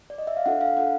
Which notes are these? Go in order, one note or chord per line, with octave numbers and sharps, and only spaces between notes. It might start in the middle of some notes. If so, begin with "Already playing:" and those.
D5
D#5
E5
F5
D4 F4 A4 F#5
F5
D4 F4 A4 F#5